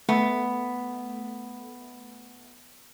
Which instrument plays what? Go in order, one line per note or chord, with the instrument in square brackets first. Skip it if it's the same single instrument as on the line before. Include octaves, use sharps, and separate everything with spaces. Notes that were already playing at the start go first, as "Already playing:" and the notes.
[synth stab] A3 [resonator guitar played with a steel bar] B3